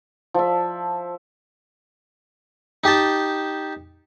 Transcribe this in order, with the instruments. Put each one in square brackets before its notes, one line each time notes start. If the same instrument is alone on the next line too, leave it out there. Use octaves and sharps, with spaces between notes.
[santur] F3 E5
[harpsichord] D#4 G4 G5 A5